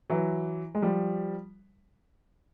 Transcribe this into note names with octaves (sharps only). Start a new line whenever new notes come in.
E3 F#3
G#3
F3 G3